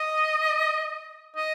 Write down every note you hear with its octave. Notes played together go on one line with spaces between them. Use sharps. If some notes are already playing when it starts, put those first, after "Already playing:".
Already playing: D#5
D#5